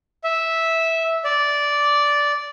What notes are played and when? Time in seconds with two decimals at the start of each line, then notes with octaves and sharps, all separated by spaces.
0.24 E5
1.24 D5